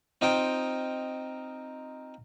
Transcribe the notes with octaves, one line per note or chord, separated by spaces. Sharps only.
C4 D#4 F4 C5 G5